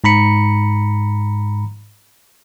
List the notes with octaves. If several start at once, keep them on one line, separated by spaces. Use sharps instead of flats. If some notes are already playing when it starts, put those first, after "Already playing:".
G#2 A#5 B5 C#7